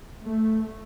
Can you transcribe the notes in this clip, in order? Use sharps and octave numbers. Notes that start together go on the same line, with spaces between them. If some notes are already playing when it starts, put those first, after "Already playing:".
A3